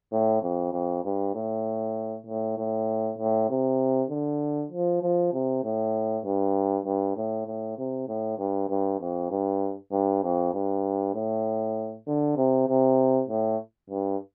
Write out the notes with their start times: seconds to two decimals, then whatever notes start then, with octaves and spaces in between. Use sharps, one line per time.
0.12 A2
0.42 F2
0.73 F2
1.04 G2
1.35 A2
2.26 A2
2.58 A2
3.18 A2
3.49 C3
4.10 D3
4.72 F3
5.02 F3
5.33 C3
5.64 A2
6.25 G2
6.85 G2
7.17 A2
7.47 A2
7.78 C3
8.08 A2
8.39 G2
8.70 G2
9.01 F2
9.30 G2
9.92 G2
10.23 F2
10.54 G2
11.14 A2
12.07 D3
12.37 C3
12.68 C3
13.29 A2
13.90 G2